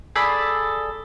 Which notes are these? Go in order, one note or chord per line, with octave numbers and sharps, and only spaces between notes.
G#4 A4 D5 B5